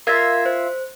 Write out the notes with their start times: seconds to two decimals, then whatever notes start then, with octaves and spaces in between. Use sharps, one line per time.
0.07 F4 A#4 E5 G#6 A#6
0.46 C5